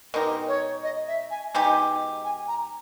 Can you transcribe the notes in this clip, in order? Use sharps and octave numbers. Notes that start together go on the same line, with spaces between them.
B2 G#3 D#4 G4 A#4
C#5
D#5
E5
G#5
B2 G#3 D#4 G4 G#5
G#5
A#5